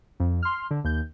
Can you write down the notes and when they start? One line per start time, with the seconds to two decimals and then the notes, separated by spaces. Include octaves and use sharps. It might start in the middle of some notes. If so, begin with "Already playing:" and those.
0.20 F2
0.42 C6 F6
0.71 D3
0.84 D#2 G6